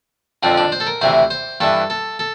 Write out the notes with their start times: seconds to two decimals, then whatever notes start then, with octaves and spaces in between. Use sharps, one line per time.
0.43 F2 D3 F3 C4
0.57 D4
0.72 C5
0.80 A4
0.87 A#4
1.01 D2 C3 E3 C5
1.30 C5
1.61 G2 E3 A4
1.90 A4
2.19 A4